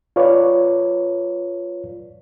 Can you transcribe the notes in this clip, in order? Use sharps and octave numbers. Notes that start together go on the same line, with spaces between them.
F4 B4 C#5 D5